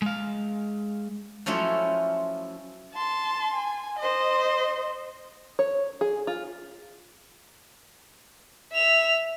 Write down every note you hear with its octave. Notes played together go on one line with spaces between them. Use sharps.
G#3 F5
F3 F#3 A3 C#4 E4 F4
A5 C6
G#5
C5 D#5
C#5
G#4
F4
E5 F7